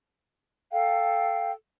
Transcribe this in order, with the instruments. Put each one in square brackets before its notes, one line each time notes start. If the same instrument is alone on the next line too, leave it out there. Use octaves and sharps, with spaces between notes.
[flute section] A4 F5 G5